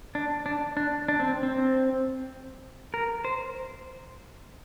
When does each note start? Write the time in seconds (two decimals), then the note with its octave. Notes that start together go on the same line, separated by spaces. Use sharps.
0.15 D4
0.46 D4
0.77 D4
1.08 D4
1.20 C4
1.43 C4
2.94 A#4
3.25 C5